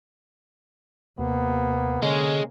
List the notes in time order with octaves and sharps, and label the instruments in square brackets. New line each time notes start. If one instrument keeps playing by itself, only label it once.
[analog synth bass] D#2 [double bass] C3 A#3 [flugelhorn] B3
[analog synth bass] D3 [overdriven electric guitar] G#3 [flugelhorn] C#4